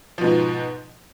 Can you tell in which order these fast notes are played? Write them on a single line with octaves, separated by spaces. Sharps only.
F3 B2 G#2